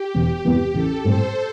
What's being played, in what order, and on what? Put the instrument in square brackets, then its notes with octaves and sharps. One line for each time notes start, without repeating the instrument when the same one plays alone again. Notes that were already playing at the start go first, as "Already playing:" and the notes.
Already playing: [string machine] G4
[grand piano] E1
E2 C3 E3 B3
[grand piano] A1 [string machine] A4
[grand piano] A2 G3 C4 [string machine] C5